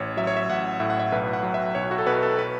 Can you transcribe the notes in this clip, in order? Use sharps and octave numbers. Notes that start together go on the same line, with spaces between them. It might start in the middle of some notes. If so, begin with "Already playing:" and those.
Already playing: A1 C#5
F#3 E5
C#5
E5
A1 F#5
A2 E5
F#5
E5
B1 B4
F#5
F#3
E5
B1 C#5
F#4
A4
B2 B4
A4
B4